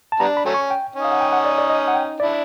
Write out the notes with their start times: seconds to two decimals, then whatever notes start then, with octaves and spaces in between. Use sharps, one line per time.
0.12 A5
0.20 G3 B3 D4 A#5
0.37 B5
0.45 F#3 A3 C#4
0.54 C#6
0.71 G5
0.95 C#4 D#4
1.04 F5
1.11 F#5
1.21 G5
1.33 F#5
1.45 D5
1.58 D5
1.70 D#5
1.88 F#5
1.95 G5
2.20 D4 E4 D5